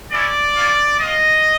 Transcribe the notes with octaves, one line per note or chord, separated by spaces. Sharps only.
G#3 C#4 E4 D5
A#3 C#4 F4
C4 F4 D#5